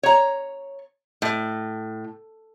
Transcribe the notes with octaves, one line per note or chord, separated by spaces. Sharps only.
C#5 A#5
A2